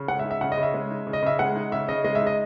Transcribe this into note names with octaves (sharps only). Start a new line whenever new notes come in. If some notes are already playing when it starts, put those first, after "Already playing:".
Already playing: C#3
G#3 F#5
E5
D#4
E5
C#3 F#5
D#5
C#3
E5
G#3
D#4
C#3
D#5
C#3 E5
G#3 F#5
D#4
C#3 E5
C#3 D#5
G#3 D#5
E5
D#4
D#5